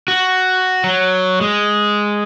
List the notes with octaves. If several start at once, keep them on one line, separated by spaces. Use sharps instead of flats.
F#4
F#3
G#3